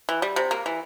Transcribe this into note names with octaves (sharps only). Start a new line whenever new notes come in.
E3
G3
C3
A#3
E3